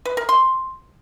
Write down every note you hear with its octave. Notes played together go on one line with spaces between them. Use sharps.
B4
A#4
C6